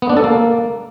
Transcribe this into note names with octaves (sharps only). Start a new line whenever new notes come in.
B3
D4
A4
A#3